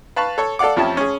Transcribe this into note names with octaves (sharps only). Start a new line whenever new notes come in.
B4 F5 A5 B5 C#6
A4 C#5
A4 D5 F5 F#5 D6
F2 F3 C#4 G4 E5 A5
C#4 G#4